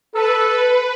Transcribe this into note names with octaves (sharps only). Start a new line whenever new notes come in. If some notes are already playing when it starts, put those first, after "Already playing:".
A4 B4